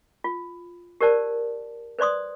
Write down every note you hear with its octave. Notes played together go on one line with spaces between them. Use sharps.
F4
G4 A#4 C5 D5 A5
B4 C5 D5 C6 D#6